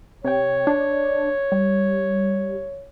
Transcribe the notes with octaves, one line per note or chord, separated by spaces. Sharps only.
C3 C#5 G5
D4
G3